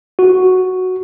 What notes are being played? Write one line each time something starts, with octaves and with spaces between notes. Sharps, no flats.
F#4